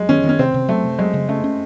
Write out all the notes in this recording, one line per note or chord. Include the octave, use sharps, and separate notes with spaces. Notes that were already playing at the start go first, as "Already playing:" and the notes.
Already playing: F#3 G#3
D#3 C#4
D#3
C#4
C3 C4
C3
F#3 A3
C3
F#3 G#3
C#3
A3 C#4
C#4